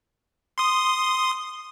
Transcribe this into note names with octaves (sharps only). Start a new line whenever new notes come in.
C6 D#6